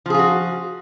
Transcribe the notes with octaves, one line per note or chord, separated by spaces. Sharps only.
F3 F4 F#4 G#4